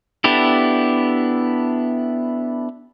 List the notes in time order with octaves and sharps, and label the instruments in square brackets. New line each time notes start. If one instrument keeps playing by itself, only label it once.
[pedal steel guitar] B3 D4 E4 G4 A4